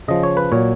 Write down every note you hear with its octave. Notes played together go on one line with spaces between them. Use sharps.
C#3 F3 D#5
C#5
B4
A#2 F#3 C#5